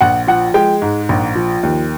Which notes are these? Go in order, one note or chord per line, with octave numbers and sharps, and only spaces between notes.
A#1 F#5
F3 F#5
G#3 G5
G#2
A#1
F3
D#2